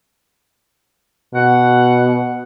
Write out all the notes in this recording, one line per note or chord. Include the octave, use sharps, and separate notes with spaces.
B2 F#5